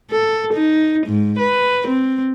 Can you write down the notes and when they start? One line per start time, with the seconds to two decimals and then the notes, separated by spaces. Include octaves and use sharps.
0.12 A4
0.54 D#4
1.07 G#2
1.39 B4
1.88 C4